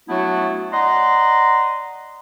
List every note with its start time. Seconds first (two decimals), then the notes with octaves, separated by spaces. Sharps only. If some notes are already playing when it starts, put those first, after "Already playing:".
0.09 F#3 A3 B3 D4 E4 F#4
0.73 D5 D#5 F#5 A#5 C6